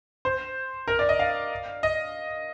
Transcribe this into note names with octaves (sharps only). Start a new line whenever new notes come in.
C5
A#4
D5
D#5
F5
D#5